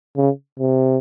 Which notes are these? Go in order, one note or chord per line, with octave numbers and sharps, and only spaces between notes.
C#3
C3